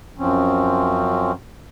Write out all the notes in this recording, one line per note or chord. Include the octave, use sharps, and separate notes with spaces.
F#2 F3 C4 C#4